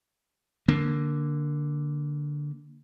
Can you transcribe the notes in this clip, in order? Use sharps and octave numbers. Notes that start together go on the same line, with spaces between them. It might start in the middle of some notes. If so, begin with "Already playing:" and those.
D3 A#3